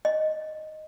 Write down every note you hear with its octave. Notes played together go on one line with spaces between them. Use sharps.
D#5